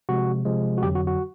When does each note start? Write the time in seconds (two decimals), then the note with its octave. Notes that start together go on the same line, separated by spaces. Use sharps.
0.09 C3 F3 G#3 F#4
0.45 C3 F3 G#3
0.78 F#4
0.82 F2 D3 F#3 G3 G4
0.95 F#4
1.07 F#4